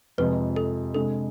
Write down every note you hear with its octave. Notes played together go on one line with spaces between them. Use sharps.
F2 C3 F3 G#3 B4
A4
C3 G#3 D4 A4